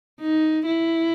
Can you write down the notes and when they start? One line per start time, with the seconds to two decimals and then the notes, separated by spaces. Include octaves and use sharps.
0.20 D#4
0.66 E4